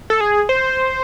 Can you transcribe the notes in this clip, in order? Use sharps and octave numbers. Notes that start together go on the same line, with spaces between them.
A4
G#4
C5